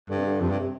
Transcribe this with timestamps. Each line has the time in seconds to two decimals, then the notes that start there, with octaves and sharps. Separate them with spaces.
0.09 G2 D3
0.18 C3
0.26 D3
0.41 F2 C3
0.49 G2
0.60 C3